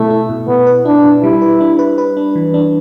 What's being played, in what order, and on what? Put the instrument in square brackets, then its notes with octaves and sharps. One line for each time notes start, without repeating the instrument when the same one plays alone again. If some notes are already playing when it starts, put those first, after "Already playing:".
Already playing: [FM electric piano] B2 E4 [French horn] A3
[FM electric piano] E4
B2
[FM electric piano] B2 [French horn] B3
[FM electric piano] B4
[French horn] D4 [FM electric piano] E4
[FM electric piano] B2
[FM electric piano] G3 [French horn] E4
[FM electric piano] B4
D4
B4
B4
D4
E3
D4